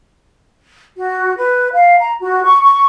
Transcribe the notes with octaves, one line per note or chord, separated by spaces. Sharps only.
F#4
B4
F5
A#5
F#4
C#6
C#6